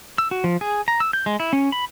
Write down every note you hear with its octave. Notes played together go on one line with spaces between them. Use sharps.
E6
F#4
F3
G#4
A#5
E6
G6
G#3
E4
C#4
B5